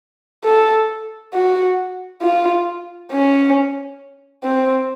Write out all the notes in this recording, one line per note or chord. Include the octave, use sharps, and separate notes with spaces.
A4
F#4
F4
C#4
C4